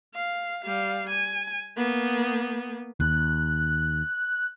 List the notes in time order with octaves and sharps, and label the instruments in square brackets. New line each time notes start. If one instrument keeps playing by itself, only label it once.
[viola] F5
G3 F5
G#5
A#3 B3
[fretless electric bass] D#2 [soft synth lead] F#6